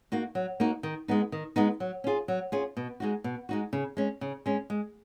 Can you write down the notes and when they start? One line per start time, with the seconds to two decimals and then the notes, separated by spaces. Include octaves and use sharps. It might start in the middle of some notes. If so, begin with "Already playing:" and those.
0.12 A#3 D#4 F#4
0.35 F#3
0.60 A#3 D#4 F#4
0.83 D#3
1.08 G#3 B3 D#4
1.32 D#3
1.56 G#3 B3 D#4
1.80 F#3
2.04 C#4 F4 G#4
2.28 F#3
2.52 C#4 F4 G#4
2.77 B2
3.00 G#3 D#4 F#4
3.24 B2
3.49 G#3 D#4 F#4
3.73 C#3
3.97 G#3 C#4
4.21 C#3
4.46 G#3 C#4
4.70 G#3